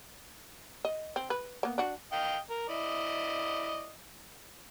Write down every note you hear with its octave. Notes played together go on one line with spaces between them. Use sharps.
D#5
C4
B4
A#3 B3
D4 F#4
D#5 F5 G5
A#4
E4 D5 D#5